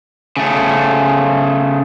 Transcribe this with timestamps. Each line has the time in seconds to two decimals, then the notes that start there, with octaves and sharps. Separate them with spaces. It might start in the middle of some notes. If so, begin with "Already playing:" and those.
0.37 C#3 A3